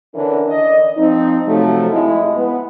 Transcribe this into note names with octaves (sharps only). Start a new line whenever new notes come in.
D3 E3 C#4 D4 A#4
D5 D#5
F3 C4 D#4
C3 F3 F#3 A3
G#3 E4
B3